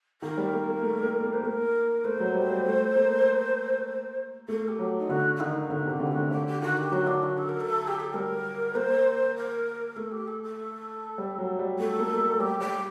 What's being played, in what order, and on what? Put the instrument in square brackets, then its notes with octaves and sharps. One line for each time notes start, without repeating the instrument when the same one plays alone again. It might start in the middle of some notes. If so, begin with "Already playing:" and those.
[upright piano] D#3 [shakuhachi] A#4
[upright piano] G3
A#3
A#3
A3
A#3
A#3
[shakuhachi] C5
[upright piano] A#3 [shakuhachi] A#4
[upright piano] A3 [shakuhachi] C5
[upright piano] F#3
G3
G3
A3
A#3
[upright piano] A3 [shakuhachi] A#4
[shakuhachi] G4
[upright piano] F#3
[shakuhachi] D#4
[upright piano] D3 [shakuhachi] F#4
[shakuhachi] F#4
[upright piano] D#3 [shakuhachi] D#4
[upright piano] D3 [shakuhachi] F#4
[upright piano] C3 [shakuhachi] G4
[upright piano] D3
[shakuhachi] D#4
[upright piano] D3 [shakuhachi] F#4
[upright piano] D3 [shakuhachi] G4
[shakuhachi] G4
[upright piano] D#3 [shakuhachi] F#4
[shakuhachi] G4
[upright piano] F#3 [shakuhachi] F#4
[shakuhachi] D4
F#4
A4
A#4
A4
G4
A4
[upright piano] G3 [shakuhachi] A#4
[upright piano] A#3 [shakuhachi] C5
[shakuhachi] A#4
[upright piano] A3 [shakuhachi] A4
[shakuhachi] G4
A4
A4
[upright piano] G3
F#3
G3
[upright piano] A3 [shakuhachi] A4
[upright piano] A#3
A3
[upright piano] G3 [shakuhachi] G4
[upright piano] G3 [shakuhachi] G4